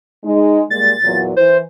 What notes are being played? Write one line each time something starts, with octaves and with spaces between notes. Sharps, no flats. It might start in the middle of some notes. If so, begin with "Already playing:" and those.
G#3 D#4
A#2 G3 G#3 A6
E2 A#2 F#3
E3 C5